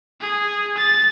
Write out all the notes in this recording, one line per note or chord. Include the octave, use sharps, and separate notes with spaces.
G#4
A6